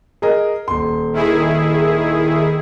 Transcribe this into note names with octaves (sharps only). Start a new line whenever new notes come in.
G#4 A#4 D#5
D#1 C6
D#3 E4 G#4